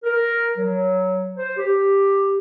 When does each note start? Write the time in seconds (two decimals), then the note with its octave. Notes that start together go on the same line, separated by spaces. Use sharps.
0.04 A#4
0.56 F#3
1.37 C5
1.57 G4